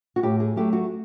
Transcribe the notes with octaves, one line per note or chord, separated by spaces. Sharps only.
F#4
A2 G4
G#4
F#3 A3 G4
F#4